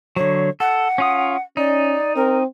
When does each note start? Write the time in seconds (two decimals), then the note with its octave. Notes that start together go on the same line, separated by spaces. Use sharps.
0.16 D3 F#3 C#5
0.60 A4 F#5
0.98 C#4 F4 D#6
1.57 C#4 D#4 D5
2.16 C4 A#4